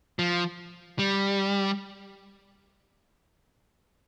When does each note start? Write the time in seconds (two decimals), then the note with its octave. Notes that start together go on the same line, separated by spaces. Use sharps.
0.19 F3
0.99 G3